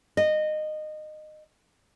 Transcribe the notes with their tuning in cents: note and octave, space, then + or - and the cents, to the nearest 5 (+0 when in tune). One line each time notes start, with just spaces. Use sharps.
D#5 -20